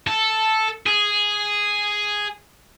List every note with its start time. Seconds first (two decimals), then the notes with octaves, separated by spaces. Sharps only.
0.07 A4
0.87 G#4